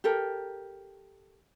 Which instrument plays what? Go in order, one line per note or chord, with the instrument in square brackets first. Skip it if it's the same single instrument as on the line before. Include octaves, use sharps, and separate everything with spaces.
[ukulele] G4 A4 A#4